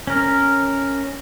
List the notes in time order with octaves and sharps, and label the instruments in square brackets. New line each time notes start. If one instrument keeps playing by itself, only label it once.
[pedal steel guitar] C#4 A#4